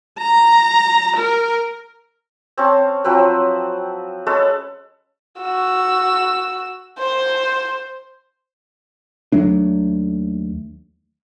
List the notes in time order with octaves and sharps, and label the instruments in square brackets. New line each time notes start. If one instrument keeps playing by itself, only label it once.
[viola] A#5
A#4
[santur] C4 C#4 A5 C6
F3 F#3 C4 B4
G#3 C#4 A4 B4
[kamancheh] F#4 E6
C5
[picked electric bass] D#2 F#3 A3 D4